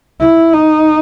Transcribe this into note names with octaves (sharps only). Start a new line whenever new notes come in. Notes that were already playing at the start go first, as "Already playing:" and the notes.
E4
D#4